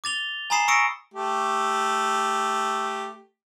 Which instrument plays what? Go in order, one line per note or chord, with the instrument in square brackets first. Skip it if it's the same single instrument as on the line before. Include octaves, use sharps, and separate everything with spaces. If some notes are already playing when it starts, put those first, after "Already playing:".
[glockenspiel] D6 A6 F7 G7
G#5 A#5 B5 D#6 C7 E7
C#6 D#6 E6 A#6 C#7 D7
[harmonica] A3 G4